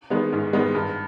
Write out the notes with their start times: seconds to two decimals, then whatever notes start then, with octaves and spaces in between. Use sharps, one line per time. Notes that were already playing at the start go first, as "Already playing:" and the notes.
0.10 D#3 G#3 B3
0.33 G#2
0.53 D#3 G#3 B3
0.75 G2